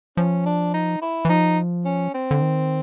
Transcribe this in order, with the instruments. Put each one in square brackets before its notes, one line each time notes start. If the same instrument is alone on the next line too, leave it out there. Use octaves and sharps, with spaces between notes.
[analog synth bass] F3 [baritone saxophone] C#4
[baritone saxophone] D4
D#4
E4
[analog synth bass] E3
[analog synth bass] F3 [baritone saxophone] D#4
[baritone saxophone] C#4
C4
[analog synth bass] D3
D#3